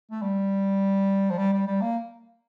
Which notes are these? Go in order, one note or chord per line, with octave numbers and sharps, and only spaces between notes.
A3
G3
F3
G3
G3
G3
A#3